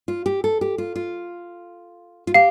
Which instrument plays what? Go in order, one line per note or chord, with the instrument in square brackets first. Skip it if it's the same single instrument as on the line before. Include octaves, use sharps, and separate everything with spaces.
[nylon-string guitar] F4
G4
A4
G4
F4
F4
F4
[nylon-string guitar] G4 [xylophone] F5